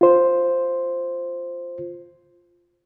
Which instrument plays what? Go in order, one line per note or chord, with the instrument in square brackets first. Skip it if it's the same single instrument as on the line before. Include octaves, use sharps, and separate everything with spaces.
[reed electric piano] F4 C5